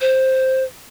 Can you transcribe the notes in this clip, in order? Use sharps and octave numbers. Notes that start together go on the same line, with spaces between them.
C5